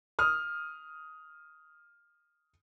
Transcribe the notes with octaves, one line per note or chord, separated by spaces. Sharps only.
D#6 F6